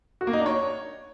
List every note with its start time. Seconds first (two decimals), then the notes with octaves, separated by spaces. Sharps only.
0.21 F#4
0.27 A#3
0.33 D#4
0.40 D4
0.46 C#5